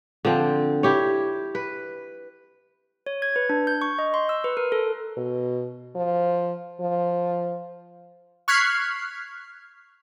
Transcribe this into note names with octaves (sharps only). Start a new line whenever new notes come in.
D3 F3 C4
E4 G4 C#5
B4
C#5
G#6
B4
D4
G6
C#6
D#5
C6
E6
B4
A#4
A4
B2
F3
F3
C#6 F6 F#6 G#6 B6 C7